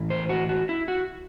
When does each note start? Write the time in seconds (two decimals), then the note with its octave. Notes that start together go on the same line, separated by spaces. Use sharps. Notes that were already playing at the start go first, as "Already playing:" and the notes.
Already playing: A2 E3
0.10 C5
0.29 F#4
0.49 F#4
0.69 E4
0.88 F#4